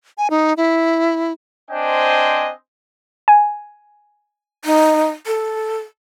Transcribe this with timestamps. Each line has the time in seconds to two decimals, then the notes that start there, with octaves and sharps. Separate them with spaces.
0.18 G#5
0.30 D#4
0.57 E4
1.70 C4 D4 C5 D#5 G5 G#5
3.28 G#5
4.65 D#4
5.26 A4